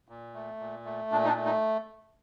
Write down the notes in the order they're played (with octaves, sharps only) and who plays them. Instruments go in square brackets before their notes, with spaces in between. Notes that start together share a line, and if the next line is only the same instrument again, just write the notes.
[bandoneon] A#2
A3
A#2
A3
A#2 D4
D#4
D4
A3
D#4